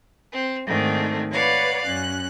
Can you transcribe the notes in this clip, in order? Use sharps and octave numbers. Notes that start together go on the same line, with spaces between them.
C4
G#2 D#3 A3 C4 D4
B4 C#5 D5 F5 F#5
F#2 C#4 F#6